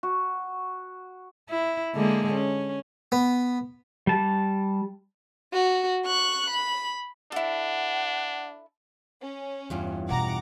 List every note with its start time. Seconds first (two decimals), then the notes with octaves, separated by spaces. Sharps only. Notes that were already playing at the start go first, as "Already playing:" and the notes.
0.03 F#4
1.49 E4
1.94 D3 G#3 A#3
2.33 C#4
3.12 B3
4.07 G3 A5
5.53 F#4
6.07 C#6 F#6
6.50 B5
7.32 D4 E4 A4 F#5
9.22 C#4
9.70 E2 G2 F4
10.09 B2 E4 F#5 A#5 D6